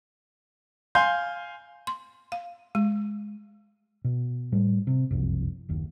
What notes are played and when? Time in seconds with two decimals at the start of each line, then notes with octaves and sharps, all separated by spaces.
0.95 F5 G#5 C6 G6
1.87 C6
2.32 F5
2.75 G#3
4.04 B2
4.52 A2 G3
4.87 C3
5.11 F#1 C2 F2
5.69 F#1 D#2